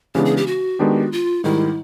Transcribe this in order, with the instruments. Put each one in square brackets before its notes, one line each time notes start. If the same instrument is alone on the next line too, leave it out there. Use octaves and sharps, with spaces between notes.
[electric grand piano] C#3 E3 G#3 B3 D4 [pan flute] G4
[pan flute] G#4
G4
F#4
[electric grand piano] D#3 G#3 B3 D4 G4
[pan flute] F4
[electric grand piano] G#2 D#3 G3 [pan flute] E4